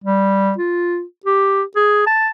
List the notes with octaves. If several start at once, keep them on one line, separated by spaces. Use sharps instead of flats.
G3
F4
G4
G#4
A5